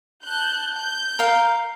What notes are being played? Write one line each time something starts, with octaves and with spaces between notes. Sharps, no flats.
A5 F#6 G6
G6
A#4 F5